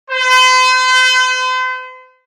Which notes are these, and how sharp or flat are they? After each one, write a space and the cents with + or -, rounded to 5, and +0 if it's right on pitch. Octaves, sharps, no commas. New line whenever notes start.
C5 -40